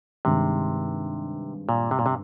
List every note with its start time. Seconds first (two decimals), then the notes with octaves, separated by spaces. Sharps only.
0.25 G2 C3 D#3 G#3 C4
1.69 A#2
1.91 C3
1.99 A#2
2.06 C3